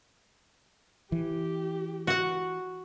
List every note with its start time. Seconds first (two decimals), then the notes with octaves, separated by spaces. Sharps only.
1.12 E3 G4
2.07 F#4 F#5